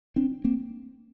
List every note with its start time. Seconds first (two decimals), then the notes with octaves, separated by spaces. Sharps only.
0.16 C4 D4
0.44 A#3 C4